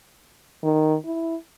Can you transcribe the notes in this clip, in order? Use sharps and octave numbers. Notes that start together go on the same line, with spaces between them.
D#3
E4